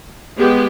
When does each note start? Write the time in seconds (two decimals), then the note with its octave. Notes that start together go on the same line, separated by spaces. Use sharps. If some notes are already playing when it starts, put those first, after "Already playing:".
0.38 G#3 B3 G4